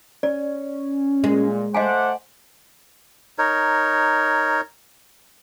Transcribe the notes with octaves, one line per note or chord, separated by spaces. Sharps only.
C#4 D5
A#2 G#3
A3 C5 D#5 F5 F#5 G#5 D6
D#4 A#4 C#5